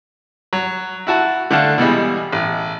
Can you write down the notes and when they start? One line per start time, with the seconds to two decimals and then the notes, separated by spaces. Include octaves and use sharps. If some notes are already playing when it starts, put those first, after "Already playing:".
0.53 F#3
1.07 E4 F#4 A5
1.51 D3 A3 D4 F5 F#5 A5
1.78 B2 E3 G3 G#3
2.33 A1